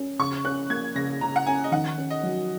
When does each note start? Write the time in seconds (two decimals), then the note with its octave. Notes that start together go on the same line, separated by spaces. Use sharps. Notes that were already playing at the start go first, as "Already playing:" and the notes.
Already playing: C#4
0.19 C#3 C#6
0.45 C#4 F#6
0.70 A#3 G#6
0.95 C#3 A#6
1.21 C#3 A#5
1.36 F#5
1.46 C#4 G#5
1.64 D#5
1.72 D#3 F#5
1.98 C#4
2.10 D#5
2.23 F#3